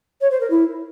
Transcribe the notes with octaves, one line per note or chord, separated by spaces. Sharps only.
C#5
C5
A#4
E4